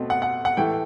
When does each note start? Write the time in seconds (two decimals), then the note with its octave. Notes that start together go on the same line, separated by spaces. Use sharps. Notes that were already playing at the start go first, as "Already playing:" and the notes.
Already playing: B2 A3 C4
0.10 F#5
0.22 F#5
0.45 F#5
0.57 A2 E3 A3 G5